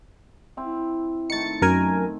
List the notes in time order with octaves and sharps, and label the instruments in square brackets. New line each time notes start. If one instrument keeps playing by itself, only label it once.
[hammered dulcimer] C4 E4
[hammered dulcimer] D#3 A3 [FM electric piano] A6 C#7
[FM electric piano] F#2 A#4 G#5